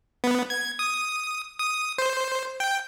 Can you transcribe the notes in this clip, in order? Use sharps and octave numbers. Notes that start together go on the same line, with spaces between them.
B3
G#6
D#6
D#6
C5
G5